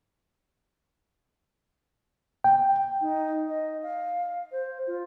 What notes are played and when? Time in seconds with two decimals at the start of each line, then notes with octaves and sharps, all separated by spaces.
2.44 G5
3.01 D#4
3.48 D#5
3.83 F5
4.52 C5
4.87 F4